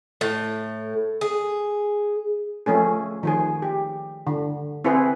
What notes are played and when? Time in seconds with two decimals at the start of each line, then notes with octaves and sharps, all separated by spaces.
0.21 A2
1.21 G#4
2.66 F3 A3 C#4 G#4
3.23 D#3 F3 G#4
3.62 G4
4.27 D3
4.84 C4 E4 G#4 B4